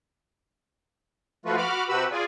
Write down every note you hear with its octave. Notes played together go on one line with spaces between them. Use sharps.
F3 A3 F4 F#4 B4
F#4 B5 D6 F6
C3 F#4 G4 B4 B5 E6
F4 G#4 D5 G#5